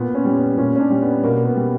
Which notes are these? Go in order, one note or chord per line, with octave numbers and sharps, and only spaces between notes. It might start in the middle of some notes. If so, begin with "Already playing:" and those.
Already playing: A#2 B3
C#4
G3
B3
A#2 C#4
C#4
D4
G3
B3
B2 A#3
B3
G3